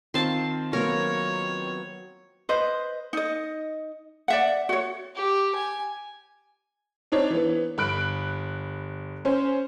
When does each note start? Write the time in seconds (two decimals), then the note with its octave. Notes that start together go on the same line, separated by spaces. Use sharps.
0.14 D#3 C4 F4 A5 C6
0.73 F#3 A#3 B3 A#4 C#5
2.49 B4 C5 D#5
3.13 D#4 D#5
4.28 D5 E5 F#5
4.69 F#4 C#5
5.15 G4
5.55 G#5
7.12 C4 D4 D#4 C#5
7.30 E3 B3
7.78 G1 B5 F#6 D7
9.25 C#4 C5